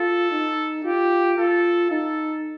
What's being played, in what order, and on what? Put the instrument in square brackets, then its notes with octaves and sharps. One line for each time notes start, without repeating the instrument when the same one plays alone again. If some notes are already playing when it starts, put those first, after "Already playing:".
Already playing: [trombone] F4 [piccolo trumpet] A4
[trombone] D#4
[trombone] F4 [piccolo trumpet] G4
[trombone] F4 [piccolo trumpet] A4
[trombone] D#4 [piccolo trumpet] A4